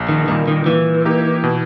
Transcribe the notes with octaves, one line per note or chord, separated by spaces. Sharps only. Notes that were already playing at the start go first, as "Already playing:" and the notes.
Already playing: A#1
D#3
A#2 D#3 G3 A#3 D#4
D#3
A#2 E3
A#3 D#4 G4
B2